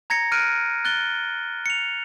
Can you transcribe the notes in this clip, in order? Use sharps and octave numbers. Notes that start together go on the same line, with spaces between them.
A#5 G#6 A#6 C#7
F6 F#6 D7 D#7
F#6 A6 G7
C#7 F7